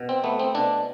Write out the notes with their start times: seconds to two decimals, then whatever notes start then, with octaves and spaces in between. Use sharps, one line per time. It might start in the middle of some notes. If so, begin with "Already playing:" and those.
Already playing: B2
0.09 C4
0.24 A3 B3
0.39 C4
0.55 B2 D4